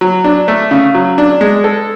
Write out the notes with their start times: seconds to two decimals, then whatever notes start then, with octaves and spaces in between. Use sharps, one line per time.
0.01 F#3
0.24 D4
0.48 A3
0.71 C#3
0.94 F#3
1.18 D4
1.41 G#3
1.64 A4